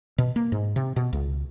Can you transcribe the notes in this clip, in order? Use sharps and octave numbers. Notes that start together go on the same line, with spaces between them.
B2
A#3
G#2
C3
B2
C#2